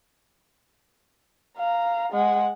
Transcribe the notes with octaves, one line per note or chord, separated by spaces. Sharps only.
F5 A#5
G#3 F#5